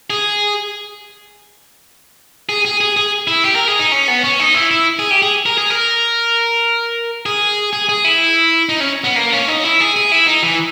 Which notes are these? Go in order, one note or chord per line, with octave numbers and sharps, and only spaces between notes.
G#4
G#4
G#4
G#4
G#4
E4
G4
A#4
G#4
D#4
C#4
B3
C#4
D#4
E4
E4
G#4
G4
G#4
A#4
G#4
A#4
G#4
G#4
G#4
E4
D#4
C#4
B3
A#3
C#4
D#4
E4
G#4
G#4
E4
D#4
E3